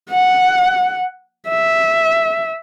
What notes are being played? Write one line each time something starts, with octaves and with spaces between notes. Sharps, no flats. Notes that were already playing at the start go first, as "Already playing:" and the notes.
F#5
E5